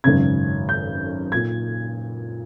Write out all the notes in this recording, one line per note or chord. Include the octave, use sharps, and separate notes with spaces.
G#1 F#2 C#3 G#6
G6
A#2 G#6